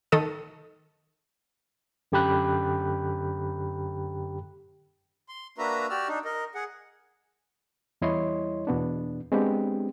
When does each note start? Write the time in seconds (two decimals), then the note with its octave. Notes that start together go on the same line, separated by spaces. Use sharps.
0.12 D#3 A4 D#6
2.12 F#2 D3 G4 G5 B5 F#6
5.29 C6
5.58 A#3 D4 F#4 B4 E5 A#5
5.90 F#4 G4 D5 E6 F6
6.08 D4 D#4
6.25 A#4 D#5
6.55 G#4 F#5
8.02 E2 G3 E4 C#5 D#5 C6
8.67 E2 B2 B3 D4
9.32 G#3 B3 C4 D4 G4